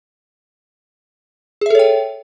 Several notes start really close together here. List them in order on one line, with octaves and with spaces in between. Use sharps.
G#4 E5 A4 C#5 G5